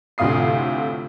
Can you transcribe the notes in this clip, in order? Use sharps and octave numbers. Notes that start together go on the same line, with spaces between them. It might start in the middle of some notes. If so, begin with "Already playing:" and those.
D2 A2 C3 F4 D#6 C7